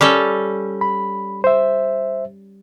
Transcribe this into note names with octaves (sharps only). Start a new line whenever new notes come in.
G3 C#4 A4
B5
C5 E5